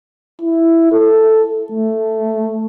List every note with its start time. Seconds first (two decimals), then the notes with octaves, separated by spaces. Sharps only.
0.42 E4
0.92 A4
1.72 A3